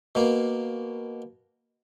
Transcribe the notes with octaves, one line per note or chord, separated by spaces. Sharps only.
B2 A#3